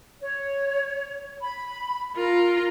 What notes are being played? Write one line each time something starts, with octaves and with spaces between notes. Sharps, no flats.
C#5
B5
F4 A#4